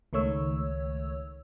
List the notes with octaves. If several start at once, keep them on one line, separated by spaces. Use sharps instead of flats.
C#2 D#3 A3 C#5 E6